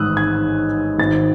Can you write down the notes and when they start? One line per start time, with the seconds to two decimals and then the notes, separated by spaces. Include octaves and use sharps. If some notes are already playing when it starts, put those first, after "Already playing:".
Already playing: A1 G#2 D#3 G#3 D#6 E6 F#6
0.17 G#6
0.98 G#1 G#2 D#3 A6